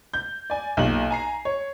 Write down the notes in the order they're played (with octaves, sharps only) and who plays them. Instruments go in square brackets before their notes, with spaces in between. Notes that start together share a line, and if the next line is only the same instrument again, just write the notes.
[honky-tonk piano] G6
D5 G#5
B1 A#2 G4 F#7
G#5 A#5 C7
C#5